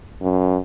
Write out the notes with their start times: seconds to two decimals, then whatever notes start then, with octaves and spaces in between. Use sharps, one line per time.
0.22 F#2